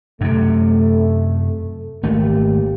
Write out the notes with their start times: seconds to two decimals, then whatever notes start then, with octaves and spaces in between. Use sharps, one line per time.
0.21 F#2 C3 A3
2.03 G#1 A3 A#3 G4